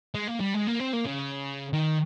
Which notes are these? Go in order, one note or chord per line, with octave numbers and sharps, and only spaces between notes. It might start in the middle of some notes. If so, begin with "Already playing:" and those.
G#3
A#3
G3
G#3
A#3
C4
A#3
C#3
D#3